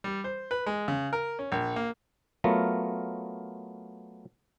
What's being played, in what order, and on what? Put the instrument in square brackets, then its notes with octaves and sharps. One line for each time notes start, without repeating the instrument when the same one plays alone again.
[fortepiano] G3
C5
B4
G#3
C#3
A#4
C#4
A#1
A#3
[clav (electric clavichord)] F#3 A3 B3 F4 A#4